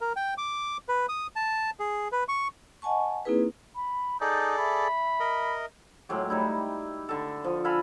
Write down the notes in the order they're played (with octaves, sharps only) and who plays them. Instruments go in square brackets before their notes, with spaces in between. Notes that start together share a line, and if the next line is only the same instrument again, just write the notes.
[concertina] A#4
G5
D6
B4
D#6
A5
G#4
B4
C#6
[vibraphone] D#5 F#5 G#5 A5 C#6
A#3 C4 D#4 E4 G#4 B4
[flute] B5
[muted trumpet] D#4 [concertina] G#4 A4 D5 [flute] G6
[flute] E5 [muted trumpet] B5
[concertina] A#4 D#5
[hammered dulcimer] A2 F#3 G#3 G4
G3 D#4 E4
D3 A4
F3
A4 F5 G#5 B5